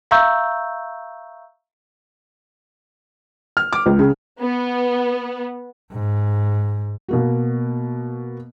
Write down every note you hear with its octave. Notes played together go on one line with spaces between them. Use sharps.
E5 F5 A#5 C#6 E6 G6
F6
D6
C#2
C#3
B3
G#2
B2 A#3 F#4